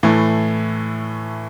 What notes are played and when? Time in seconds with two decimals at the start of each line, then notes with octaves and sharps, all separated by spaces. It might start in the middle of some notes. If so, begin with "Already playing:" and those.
0.03 A2 E3 A3